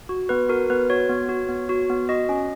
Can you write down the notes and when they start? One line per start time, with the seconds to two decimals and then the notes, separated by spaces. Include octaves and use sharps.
0.09 F#4
0.29 B3 B4
0.49 F#4 A#4
0.70 B3 B4
0.90 F#4 C#5
1.09 B3
1.29 F#4
1.49 B3
1.69 F#4
1.90 B3
2.09 F#4 D#5
2.29 C#4